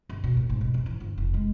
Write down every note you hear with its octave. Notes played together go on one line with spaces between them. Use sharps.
G1
B2
A2
G#1
B2
F#2
E3
G1
F1
G#3